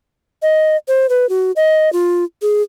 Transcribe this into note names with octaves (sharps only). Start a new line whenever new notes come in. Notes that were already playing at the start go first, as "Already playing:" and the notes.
D#5
C5
B4
F#4
D#5
F4
G#4